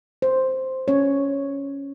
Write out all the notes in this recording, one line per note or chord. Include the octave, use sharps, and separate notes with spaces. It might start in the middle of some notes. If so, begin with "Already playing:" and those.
C5
C#4 C#5